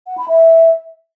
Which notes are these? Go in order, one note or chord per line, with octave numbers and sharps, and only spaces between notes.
F#5
B5
E5